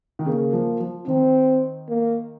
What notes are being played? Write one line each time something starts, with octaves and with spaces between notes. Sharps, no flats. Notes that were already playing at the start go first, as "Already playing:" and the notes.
D#3
C#3 A#3
F3
F3
D#3 C4
A#3